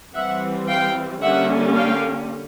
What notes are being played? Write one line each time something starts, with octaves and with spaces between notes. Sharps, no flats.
E3 G3 C4 E5 F#5
F5 G5
D3 G3 A#3 C#4 E5 F#5
F5 G5